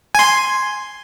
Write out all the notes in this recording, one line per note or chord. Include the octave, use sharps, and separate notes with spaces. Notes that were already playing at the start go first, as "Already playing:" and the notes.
G#5 C6